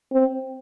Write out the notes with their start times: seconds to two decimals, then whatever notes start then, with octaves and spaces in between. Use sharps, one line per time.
0.12 C4